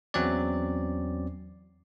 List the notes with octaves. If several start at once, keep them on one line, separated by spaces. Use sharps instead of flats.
E2 F#3 C4 C#4 D5